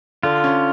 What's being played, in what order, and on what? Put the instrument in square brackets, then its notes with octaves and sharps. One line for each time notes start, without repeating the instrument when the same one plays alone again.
[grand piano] D3 [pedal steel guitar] F4
[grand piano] C#4